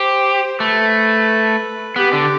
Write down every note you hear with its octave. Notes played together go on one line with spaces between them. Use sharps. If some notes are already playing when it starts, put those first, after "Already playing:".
Already playing: G4 C5
A3 B4
B3 G4
D3